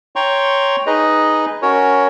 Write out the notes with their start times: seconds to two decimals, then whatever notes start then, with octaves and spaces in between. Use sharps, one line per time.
0.16 C#5 G5 A#5 C6 C#6
0.86 D#4 G#4 B4 D#5
1.62 C#4 F#4 A#4 C#5